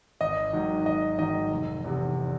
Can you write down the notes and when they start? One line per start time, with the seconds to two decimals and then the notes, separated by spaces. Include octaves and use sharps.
0.20 G#1 D#5
0.53 G#2 D#3 F#3
0.86 G#1 D#5
1.18 G#2 D#3 F#3 D#5
1.51 F1
1.84 E2 C3